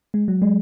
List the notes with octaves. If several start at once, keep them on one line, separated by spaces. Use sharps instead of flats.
G#3
F#3
G#3